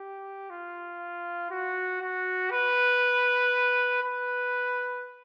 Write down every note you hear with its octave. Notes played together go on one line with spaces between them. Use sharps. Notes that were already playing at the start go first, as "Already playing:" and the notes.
Already playing: G4
F4
F#4
F#4
B4
B4